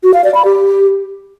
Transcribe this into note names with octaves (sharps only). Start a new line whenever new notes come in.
F#4
F5
D5
B5
G4